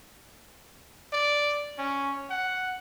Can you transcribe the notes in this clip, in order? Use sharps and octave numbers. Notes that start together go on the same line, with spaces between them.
D5
C#4
F#5